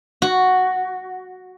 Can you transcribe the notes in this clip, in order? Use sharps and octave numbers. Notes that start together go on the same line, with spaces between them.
F#4